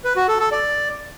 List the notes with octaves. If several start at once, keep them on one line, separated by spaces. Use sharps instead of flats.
B4
F#4
A4
A4
D5